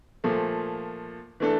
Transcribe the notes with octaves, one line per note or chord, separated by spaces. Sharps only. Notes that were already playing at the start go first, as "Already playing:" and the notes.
A#2 F3 A3
E3 A3 D4 A4